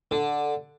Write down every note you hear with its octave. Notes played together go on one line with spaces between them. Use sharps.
D3